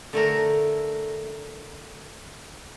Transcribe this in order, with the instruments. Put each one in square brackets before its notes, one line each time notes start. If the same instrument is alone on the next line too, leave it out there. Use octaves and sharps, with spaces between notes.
[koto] D3 A3 A#4